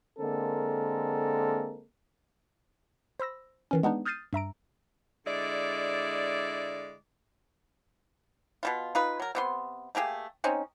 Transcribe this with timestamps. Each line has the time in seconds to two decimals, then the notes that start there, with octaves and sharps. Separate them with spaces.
0.19 D3 G#3 A#3 C4 A4 A#4
3.19 C5 B5 E6 A#6
3.71 D#3 E3 C#4
3.83 G#3 B3 D4 D#4
4.06 D#6 F6 G6 A6 C7 D#7
4.33 G2 E5 A#5 D7
5.27 D3 G#3 E4 D5
8.63 B2 D#3 F4
8.95 D#4 F4 B4
9.20 F#3 A#4
9.35 C3 B3 C6
9.95 A3 A#3 G4 G#4
10.44 C4 C#4 D#4